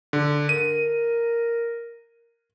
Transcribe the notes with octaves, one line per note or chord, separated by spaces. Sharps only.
D3
A#4 D#7